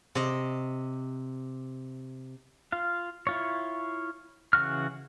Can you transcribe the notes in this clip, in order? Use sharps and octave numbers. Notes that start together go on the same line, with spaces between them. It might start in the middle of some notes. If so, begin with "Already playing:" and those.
C3 D#5
F4 F5
E4 F4 C#5
C#3 E3 F#4 F6